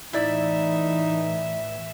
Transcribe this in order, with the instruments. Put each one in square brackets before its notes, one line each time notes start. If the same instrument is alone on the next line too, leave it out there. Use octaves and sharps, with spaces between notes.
[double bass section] A2 E3 [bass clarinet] D#4 [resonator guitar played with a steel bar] E4 D5 [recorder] E5